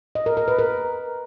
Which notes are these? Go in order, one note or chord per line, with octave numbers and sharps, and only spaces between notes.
D#5
A#4
A#4
B4
A#4